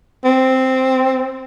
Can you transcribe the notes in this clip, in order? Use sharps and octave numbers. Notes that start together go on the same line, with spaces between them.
C4